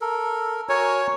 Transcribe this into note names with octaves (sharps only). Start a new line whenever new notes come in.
A4 A#4
F#4 A#4 C#5 G#5